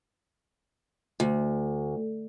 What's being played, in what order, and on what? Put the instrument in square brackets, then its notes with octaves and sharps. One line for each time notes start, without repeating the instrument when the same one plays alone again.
[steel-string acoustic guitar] D2